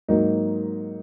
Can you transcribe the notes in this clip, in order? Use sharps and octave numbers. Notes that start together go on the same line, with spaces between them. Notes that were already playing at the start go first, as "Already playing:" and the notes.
G#2 F#3 A#3 D#4